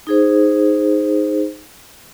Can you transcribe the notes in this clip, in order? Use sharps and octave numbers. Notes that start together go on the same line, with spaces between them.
D#4 G#4 C5